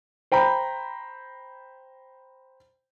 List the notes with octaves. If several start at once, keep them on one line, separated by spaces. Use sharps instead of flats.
C5 G5 A#5 B5